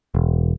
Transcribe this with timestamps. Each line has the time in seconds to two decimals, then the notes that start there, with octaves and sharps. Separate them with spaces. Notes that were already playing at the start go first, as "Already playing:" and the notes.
0.15 E1